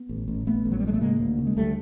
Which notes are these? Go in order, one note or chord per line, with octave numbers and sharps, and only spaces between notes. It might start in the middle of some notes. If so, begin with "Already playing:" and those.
Already playing: B3
A1
A1
A1 A3 B3
A1
F#3
G3
A2 G#3
A3
C#3 G#3 A#3
D2
C#3
G#3
D2 G3 A3